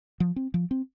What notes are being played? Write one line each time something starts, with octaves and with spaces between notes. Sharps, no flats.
F3
C4
F3
C4